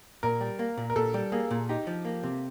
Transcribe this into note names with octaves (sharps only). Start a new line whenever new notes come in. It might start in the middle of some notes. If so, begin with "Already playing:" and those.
A#2 A#4
G3
A#3
A#2
A#4
A#2 A4
G3
A#3 G#4
A#2
D#4 G4
F3
A#3
C3